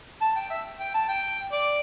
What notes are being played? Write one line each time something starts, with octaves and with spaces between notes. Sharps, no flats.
A5
G5
E5
G5
A5
G5
D5